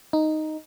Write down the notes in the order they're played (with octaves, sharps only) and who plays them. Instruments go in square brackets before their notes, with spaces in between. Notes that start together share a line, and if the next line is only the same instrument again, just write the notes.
[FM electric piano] D#4